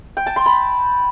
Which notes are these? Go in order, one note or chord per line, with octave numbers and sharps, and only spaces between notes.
G5
A5
C6
B5